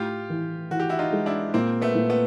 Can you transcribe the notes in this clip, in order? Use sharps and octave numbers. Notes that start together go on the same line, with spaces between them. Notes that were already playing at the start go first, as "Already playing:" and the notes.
Already playing: A2 F4 G4
E3
E3 F#4
G4
E4 F#4
D#4 F4
G#3
D4 E4
A#2 A#3 C4
A3 B3
A#2
A3 B3